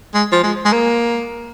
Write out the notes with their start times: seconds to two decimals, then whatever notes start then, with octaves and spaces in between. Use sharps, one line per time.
0.14 G#3
0.32 F3
0.43 G#3
0.65 G#3
0.73 A#3